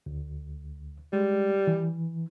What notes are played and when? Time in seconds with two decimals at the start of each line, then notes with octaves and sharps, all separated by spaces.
0.06 D2
1.13 G3 G#3
1.67 E3